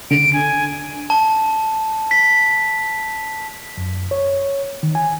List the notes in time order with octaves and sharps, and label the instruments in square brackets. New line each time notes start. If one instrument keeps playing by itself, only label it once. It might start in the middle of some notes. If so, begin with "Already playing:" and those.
[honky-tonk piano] D3 [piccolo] D7
[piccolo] G#5
[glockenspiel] A5
B6
[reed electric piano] F#2
C#5
D#3
G#5